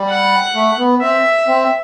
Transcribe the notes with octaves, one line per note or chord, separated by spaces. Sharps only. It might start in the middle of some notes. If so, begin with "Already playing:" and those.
Already playing: G3
F#5
A3
B3
C4 E5
C4